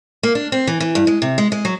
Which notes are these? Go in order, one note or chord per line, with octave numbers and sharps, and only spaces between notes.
A#3
D4
C4
E3
E3
G2
G#3
C3
G#3
G#3
F#3